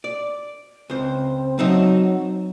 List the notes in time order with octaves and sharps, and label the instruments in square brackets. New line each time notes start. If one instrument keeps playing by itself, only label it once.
[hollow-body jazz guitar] D5
[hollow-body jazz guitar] C#2 C5 [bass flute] C4
[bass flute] F#3 [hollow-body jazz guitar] C4 D#4 E5